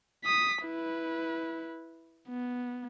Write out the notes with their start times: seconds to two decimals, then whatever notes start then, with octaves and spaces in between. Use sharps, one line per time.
0.25 D#6 B6
0.64 E4 B4
2.29 B3